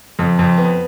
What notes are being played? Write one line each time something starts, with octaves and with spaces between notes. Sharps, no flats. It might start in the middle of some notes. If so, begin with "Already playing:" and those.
F2
F2
B3